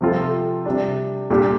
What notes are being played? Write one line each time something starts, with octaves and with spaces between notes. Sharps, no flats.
C3 F3 C4 F4 A4
C3 G3 D4
A#2 G3 D4 G4